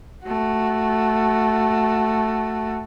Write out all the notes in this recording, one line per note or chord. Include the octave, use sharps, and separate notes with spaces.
A3 F#4